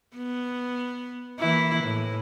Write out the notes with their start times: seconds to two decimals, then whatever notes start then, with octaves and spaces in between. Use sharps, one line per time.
0.17 B3
1.40 E3 A#3 E4
1.83 A2